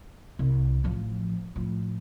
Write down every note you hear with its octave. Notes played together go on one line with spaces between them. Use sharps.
C2
A1 F3
A2 F3